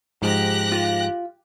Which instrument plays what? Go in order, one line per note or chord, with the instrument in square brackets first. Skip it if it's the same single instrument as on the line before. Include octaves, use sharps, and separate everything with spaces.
[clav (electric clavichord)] G#2 F3 G#3 [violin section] G4 F#6 A#6
[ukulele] F4